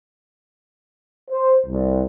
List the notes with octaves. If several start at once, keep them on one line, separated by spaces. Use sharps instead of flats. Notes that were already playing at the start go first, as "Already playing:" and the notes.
C5
C2